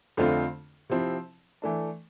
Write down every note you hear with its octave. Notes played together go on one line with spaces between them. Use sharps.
F2 D3 A3 C4 F4
C3 F3 C4 E4
E3 A3 D4